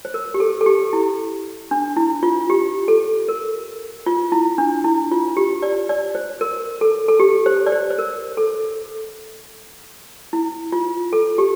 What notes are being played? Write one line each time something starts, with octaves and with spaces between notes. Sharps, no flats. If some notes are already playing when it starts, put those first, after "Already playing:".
C5
A#4
G4
A4
A4
G4
E4
D4
E4
F4
G4
A4
A#4
F4
E4
D4
E4
F4
G4
D5
D5
C5
A#4
A4
A4
G4
C5
D5
C5
C5
A#4
A4
E4
F4
A4
G4